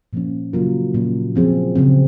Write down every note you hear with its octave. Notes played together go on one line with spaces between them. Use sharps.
A#2 F3 A#3 C#4
C#3 F#3 A#3 F4 A#4
A#2 F#3 C#4
A#2 F3 C4 F4 G#4
C#3 F#3 C4